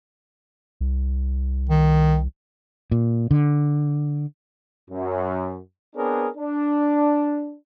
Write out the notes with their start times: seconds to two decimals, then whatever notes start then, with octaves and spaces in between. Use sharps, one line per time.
0.81 C2
1.69 D#3
2.92 A#2
3.31 D3
4.91 F#2
5.96 B3 C4 D4 G#4 A#4 C#5
6.37 D4